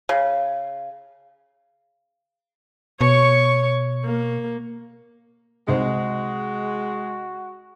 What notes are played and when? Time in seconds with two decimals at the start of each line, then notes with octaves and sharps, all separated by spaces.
0.09 C#3
3.01 B2 C#5 C#6
4.05 A#3
5.68 C2 G#3 D#4 F#4 C5